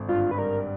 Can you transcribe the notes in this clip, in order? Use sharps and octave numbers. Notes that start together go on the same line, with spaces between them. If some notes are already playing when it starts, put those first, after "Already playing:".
Already playing: G#1 D3
G2 F4
B4
G3 A#4